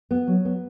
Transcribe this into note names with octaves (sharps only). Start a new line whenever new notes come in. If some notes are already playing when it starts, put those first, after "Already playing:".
B3
F#3
B3